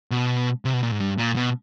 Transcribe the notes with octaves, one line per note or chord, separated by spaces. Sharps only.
B2
C3
B2
A#2
G#2
G2
A#2
B2